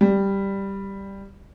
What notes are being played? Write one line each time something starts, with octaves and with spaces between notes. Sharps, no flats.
G3